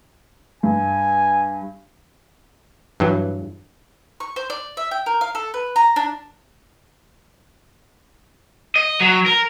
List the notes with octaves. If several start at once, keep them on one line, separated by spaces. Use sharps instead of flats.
G2 G#5
G2 E3 F#3
C#6
C5
D5
E5
G5
A#4
F5
A4
B4
A#5
D4
D#5
F#3
A#4